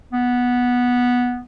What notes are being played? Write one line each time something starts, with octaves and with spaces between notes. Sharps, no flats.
B3